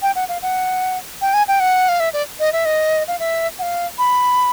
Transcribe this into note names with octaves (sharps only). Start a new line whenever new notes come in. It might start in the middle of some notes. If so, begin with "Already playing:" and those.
G5
F#5
F5
F#5
G5
G#5
G5
F#5
F5
E5
D5
D#5
E5
D#5
F5
E5
F#5
F5
B5